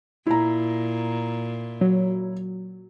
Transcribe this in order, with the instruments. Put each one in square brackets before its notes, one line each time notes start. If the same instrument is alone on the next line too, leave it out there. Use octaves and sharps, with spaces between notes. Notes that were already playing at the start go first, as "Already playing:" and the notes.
[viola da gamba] A#2 [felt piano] E4 A#5
[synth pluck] F#3